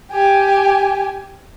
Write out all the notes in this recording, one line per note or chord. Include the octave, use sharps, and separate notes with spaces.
G4 G#5